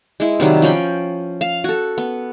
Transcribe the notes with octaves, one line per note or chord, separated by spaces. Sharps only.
G#3 E4
C3 D#3 F#3 G3
F3 C#4 G5 B5
F5
F#4 A4
B3